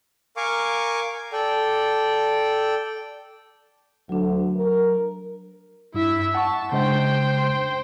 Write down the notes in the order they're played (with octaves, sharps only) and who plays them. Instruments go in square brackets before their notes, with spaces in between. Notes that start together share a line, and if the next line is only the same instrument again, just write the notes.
[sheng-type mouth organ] A#4 F5 G#5 C#6 D6
A4 D5 G5
[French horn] D2 [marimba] F#3 D4
[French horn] A#4
[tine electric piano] G2 [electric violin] E4 E5
[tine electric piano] F#5 C#6 [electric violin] A5
[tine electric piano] C#3 G#3 D4 [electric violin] C5 G5